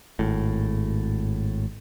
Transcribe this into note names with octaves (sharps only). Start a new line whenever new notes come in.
G#1 A2